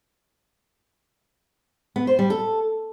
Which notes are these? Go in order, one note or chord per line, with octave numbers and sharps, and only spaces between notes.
B3
C5
G3
A4